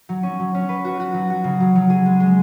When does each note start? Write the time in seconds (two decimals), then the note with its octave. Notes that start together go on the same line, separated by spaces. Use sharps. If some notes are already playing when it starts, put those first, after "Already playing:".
0.09 F#3
0.23 C#4
0.39 F#3
0.55 C#4
0.69 B4
0.85 F#4
1.00 F#4
1.14 F#3
1.30 F#4
1.44 C#3
1.60 F#3
1.75 F#3
1.90 G#4
2.06 G#3
2.20 G#3